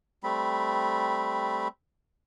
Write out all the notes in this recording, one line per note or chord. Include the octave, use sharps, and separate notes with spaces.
G3 A3 C4 B5